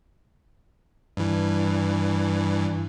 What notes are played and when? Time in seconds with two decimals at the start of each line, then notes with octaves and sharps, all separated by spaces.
1.17 G2 E3